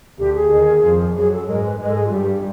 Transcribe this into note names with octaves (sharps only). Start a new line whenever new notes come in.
D2 D3 G4
G#4
D#2 D#3
F2 F3
F#2 F#3 G#4
A4
G#2 G#3 A#4
B4
G#2 G#3 B4
A4
G#4
F4
G2 G3 G4